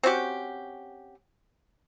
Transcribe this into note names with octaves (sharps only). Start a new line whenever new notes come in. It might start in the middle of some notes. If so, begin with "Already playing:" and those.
C4 C#4 F#4 G4